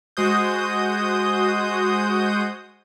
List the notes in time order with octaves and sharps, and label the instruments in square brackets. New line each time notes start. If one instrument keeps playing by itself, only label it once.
[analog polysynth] G#3 F#4 C5 D#6 G6